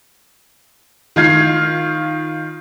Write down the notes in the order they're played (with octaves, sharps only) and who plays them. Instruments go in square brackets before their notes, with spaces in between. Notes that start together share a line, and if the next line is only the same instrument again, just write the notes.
[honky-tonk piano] D#3 F4 G#6 C7